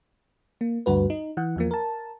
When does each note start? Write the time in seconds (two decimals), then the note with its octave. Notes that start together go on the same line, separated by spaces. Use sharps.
0.61 A#3
0.86 D2 G2 F#4 B4
1.10 D#4
1.37 E3 F#5
1.56 E2 F3 A#3
1.71 A#4 A5